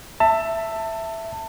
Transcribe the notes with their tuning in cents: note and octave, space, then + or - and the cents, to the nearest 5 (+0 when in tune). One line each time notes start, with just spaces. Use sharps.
E5 +5 A5 +25